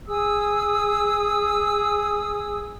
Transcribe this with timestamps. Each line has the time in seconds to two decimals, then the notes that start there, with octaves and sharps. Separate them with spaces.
0.07 G#4 D#6 E6